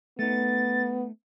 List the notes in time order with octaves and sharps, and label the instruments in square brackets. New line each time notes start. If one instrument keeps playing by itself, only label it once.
[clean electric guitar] A3 D#4 [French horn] B3 [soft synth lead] A6